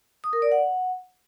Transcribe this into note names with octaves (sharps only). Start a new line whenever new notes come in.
D#6
A#4
D5
F#5